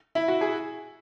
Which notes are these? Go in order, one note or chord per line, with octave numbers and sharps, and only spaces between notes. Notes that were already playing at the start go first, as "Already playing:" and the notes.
E4
F#4
G#4